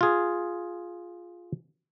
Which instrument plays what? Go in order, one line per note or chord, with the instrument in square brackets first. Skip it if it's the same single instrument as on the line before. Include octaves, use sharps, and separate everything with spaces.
[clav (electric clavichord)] F4 G#4